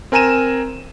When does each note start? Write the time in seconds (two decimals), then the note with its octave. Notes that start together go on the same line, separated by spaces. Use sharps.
0.12 C4 A#4 G#5 A#5 D#7 E7